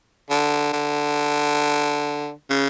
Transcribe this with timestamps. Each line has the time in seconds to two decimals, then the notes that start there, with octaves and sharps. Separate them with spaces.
0.30 D3
0.73 D3
2.50 C#3